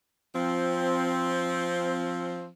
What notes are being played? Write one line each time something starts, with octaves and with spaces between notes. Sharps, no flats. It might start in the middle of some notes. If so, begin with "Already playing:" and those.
F3 C4